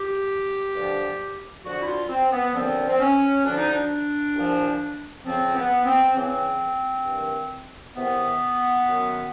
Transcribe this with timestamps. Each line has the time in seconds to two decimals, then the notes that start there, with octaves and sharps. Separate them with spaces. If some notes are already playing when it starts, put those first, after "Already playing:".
Already playing: G4
0.74 G2 D3 F3
1.64 F2 D3 F3 F#4
1.81 E4
1.86 F4
2.09 C4
2.32 B3
2.54 D#2 D3 F3 C4
2.88 C4
3.00 C#4
3.45 D2 D3 F3 D4
3.58 D#4
3.70 D4
4.35 C2 A#2 F3
5.25 F2 C#3 F3 C4
5.55 B3
5.85 C4
6.15 E2 C#3 E3 C4
7.05 G2 D#3
7.96 E2 C3 D#3 B3
8.86 F#2 D#3